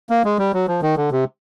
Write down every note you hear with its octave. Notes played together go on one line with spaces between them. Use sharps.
A#3
G#3
G3
F#3
F3
D#3
D3
C3